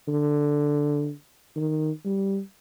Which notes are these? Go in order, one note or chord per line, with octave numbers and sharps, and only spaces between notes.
D3
D#3
G3